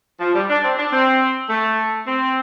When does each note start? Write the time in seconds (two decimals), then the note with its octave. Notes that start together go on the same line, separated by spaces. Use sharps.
0.21 F3
0.35 G3
0.50 D4
0.64 C4
0.78 D4
0.92 C4
1.50 A3
2.07 C4